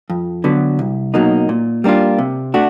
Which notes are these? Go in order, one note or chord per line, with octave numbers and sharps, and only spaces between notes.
F2
D3 F#3 B3
C2
B2 F#3 A#3 D#4
A#2
G3 A#3 D4 F4
C3
A3 D4 F#4